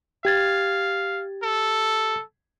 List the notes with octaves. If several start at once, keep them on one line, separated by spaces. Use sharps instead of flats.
G4 F5 G#6 A6
A4